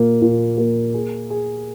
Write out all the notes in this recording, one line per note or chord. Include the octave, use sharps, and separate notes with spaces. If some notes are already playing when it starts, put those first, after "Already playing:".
Already playing: A#2 A#3
A#2
A#3
G#4
G#4